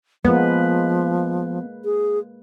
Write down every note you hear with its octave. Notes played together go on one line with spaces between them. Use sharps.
F3 G#3 A#3 B3 B4
G#4